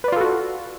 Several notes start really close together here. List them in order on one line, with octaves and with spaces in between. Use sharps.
B4 D5 F4 A4 F#4